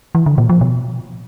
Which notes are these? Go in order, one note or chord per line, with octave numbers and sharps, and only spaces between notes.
E3
D3
A#2
F3
B2